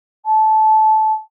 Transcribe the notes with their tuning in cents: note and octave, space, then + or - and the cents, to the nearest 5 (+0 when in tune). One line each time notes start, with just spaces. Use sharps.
A5 -15